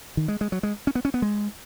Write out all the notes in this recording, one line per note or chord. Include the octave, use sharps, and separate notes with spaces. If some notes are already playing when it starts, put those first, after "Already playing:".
D#3
G#3
G#3
F#3
G#3
C#4
B3
C#4
B3
G#3